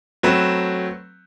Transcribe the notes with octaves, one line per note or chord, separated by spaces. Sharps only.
F#3 A3 C4 B4